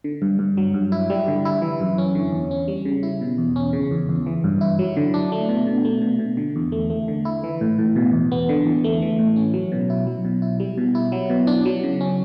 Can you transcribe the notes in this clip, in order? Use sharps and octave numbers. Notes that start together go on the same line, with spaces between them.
D3
G2
G2
F#3
G2
E4
G3
D3
E4
E3
F#2
C#4
D3
E2
C#4
G3
C#3
E4
B2
E2
C#4
C#3
E2
E2
E3
G2
E4
F#3
D3
D4
A3
B2
B2
A3
B2
B2
D3
E2
A3
A3
D3
E4
E3
A2
A2
B2
E2
B3
D3
E2
A3
E3
A2
C#4
F#3
B2
E4
F#3
B2
E4
G3
B2
E4
F#3
B2
D4
F#3
C#3
C#4